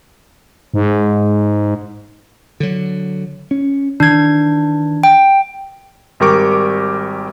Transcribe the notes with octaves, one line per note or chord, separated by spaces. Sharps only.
G#2
D3 F#3
C#4
D#3 E3 D4 G#6
G5
G#1 G3 G4 A#4 C#6 D6